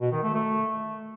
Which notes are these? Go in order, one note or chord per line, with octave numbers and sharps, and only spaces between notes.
B2
D#3
A3
A3